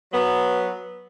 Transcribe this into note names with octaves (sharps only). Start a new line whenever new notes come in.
F#3 B3